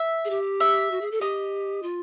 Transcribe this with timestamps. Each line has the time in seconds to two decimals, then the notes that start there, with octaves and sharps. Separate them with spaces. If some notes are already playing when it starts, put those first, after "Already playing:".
Already playing: E5
0.25 G#4
0.30 G4
0.60 E5
0.91 F#4
1.01 G#4
1.12 A4
1.21 G4 D#5
1.83 F4